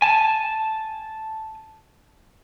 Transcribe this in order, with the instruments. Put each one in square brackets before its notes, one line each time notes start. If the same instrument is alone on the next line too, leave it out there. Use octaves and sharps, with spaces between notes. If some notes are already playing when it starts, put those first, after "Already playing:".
[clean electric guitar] G#5 A5